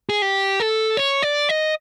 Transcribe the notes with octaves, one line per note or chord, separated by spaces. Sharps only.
G#4
G4
A4
C#5
D5
D#5